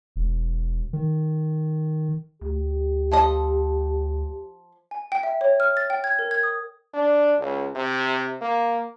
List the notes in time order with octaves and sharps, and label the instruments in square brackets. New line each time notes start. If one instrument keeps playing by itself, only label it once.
[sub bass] E1
D#3
[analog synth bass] D2 [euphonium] G4
[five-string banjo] F3 A4 D#5
[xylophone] G#5
G5
E5
C#5
F6
A6
G5
G#6
A#4
G#6
D#6
[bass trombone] D4
C#2
C3
A#3